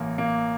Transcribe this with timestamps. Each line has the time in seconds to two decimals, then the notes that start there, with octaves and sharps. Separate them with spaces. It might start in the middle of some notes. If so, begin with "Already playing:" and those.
Already playing: A1 A#3
0.18 A#3